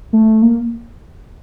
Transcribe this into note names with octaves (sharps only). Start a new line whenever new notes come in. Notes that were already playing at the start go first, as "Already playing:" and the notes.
A3
A#3